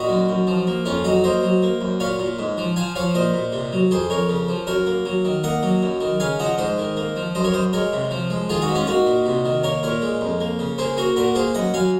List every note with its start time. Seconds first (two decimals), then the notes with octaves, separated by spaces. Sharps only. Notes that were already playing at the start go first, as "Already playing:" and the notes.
Already playing: A#2 D#4 F#4
0.09 F#2
0.29 F#2
0.47 F3
0.67 A#3
0.85 F2 C#4 F4
1.04 F#3 D#4 F#4
1.24 A#3 C5 D#5
1.43 F#3
1.63 A#3
1.81 F#2
2.00 A#2 C#5 F5
2.19 A#2
2.39 G#2
2.58 F3
2.76 F3 F5 G#5
2.95 F3 C#5 F5
3.14 A#2 C5 D#5
3.34 A#2
3.52 C3
3.73 F#3
3.91 F2 G#4 C5
4.10 F2 A#4 C#5
4.29 C#3
4.49 F3
4.67 F#2 A#4 C#5
4.87 A#3
5.06 F#3
5.25 D#3
5.43 A#3 D#5 F#5
5.63 F#3
5.82 F#2
6.01 D#3
6.20 C#3 F5 G#5
6.39 F3 D#5 F#5
6.58 G#2 C5 D#5
6.78 D#3
6.97 A#3
7.16 F3
7.35 F#2 C5 D#5
7.44 A#4 C#5
7.54 F#2 C5 D#5
7.73 G#3 A#4 C#5
7.93 C3
8.11 F3
8.30 G#3
8.49 D#3 F4 G#4
8.62 D#4 F#4
8.68 G#2
8.75 C#4 F4
8.87 A#3 D#4 F#4
9.06 A#2
9.26 C3
9.45 D#3
9.63 A#3 A#4 C#5
9.83 A#2 A#4 C#5
10.02 G#3
10.21 F2
10.40 A#3
10.59 C#3
10.78 A#3 G#4 C5
10.97 A#3 F#4 A#4
11.16 A#2 F#4 A#4
11.35 A#3 G#4 C5
11.54 F#2 D#5 F#5
11.73 F#2 F5 G#5